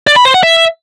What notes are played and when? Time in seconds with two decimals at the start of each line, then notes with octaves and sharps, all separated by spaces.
0.07 D5
0.16 B5
0.25 C5
0.34 F#5
0.43 E5